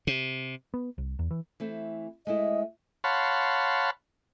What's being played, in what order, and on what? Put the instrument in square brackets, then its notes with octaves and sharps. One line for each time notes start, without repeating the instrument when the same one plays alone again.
[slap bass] C3
[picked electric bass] B3
C2
E2
E3
[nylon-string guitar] E3 A3 C4
[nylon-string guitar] G#3 A3 E4 [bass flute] D#5
[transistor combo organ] C#5 F5 F#5 A5 B5 C6